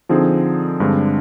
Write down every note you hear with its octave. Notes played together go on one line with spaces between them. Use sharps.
D3 F3 C4 D#4 G#4
G2 D3 G#3 C4